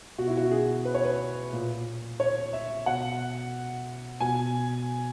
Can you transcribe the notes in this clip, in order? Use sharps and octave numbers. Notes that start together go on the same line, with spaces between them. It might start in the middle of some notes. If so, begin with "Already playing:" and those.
B2 F#4
E4
F#4
G#4
B4
C#5
B4
A#2
C#5
E5
B2 F#5
B2 G#5